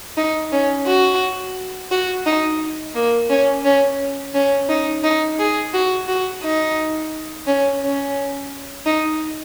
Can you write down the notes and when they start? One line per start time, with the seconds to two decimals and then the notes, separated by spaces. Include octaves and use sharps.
0.17 D#4
0.52 C#4
0.87 F#4
1.91 F#4
2.26 D#4
2.95 A#3
3.30 C#4
3.65 C#4
4.34 C#4
4.69 D#4
5.04 D#4
5.39 G#4
5.73 F#4
6.08 F#4
6.43 D#4
7.47 C#4
7.82 C#4
8.86 D#4